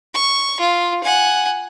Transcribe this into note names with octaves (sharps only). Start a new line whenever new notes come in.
C#6
F4
F#5 G#5